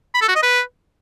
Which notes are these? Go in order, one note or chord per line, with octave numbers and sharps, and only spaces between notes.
B5
A4
F#4
D#5
B4